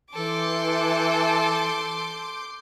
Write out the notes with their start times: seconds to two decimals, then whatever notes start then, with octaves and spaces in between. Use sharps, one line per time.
0.14 E3 A4 C6 D6 G6